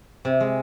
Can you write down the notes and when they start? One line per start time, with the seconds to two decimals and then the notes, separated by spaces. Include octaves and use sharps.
0.25 C3
0.40 G#3